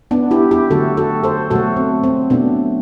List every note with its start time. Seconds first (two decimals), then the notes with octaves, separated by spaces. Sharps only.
0.11 B3 D4
0.31 E4 G4
0.51 E4 G4
0.70 D3 F#3 A3 F#4 A4
0.97 F#4 A4
1.24 A4 C5
1.51 B2 F#3 A3 F#4 A4
1.76 C4
2.04 C4
2.30 B2 F#3 A3 B3 D4